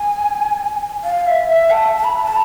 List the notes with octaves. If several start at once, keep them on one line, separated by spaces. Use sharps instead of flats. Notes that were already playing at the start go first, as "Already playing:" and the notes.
Already playing: G#5
F5
E5
E5
A5
A5
B5
A5